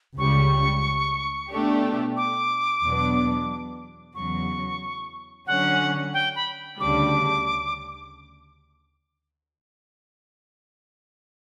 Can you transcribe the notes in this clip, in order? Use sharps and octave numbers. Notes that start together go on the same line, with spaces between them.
C#2 C#3 G3 C#6
B2 A3 D4 G4
D6
E2 B2 F#3 B3 D4
E2 C#3 F#3 C#6
D3 F#3 C#4 F#5
G5
B5
D2 C#3 G3 D4 D6